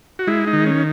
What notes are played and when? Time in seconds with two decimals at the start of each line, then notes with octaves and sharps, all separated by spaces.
0.19 F#4
0.27 G#3 E4
0.47 D#4
0.53 D#3
0.66 C#4